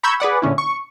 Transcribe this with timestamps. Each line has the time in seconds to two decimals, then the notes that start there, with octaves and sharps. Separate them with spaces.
0.03 A#5 B5 C#6 E6 G6 G#6
0.20 G#4 B4 D5 F#5
0.42 A#2 D3 C#4 E4
0.58 C#6